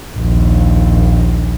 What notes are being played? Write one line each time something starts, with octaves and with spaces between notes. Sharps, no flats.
A#1 D#2